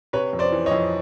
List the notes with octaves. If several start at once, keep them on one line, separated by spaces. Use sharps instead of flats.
C3 B4 C#5
F2
C5 D5
E3
C#5 D#5
F2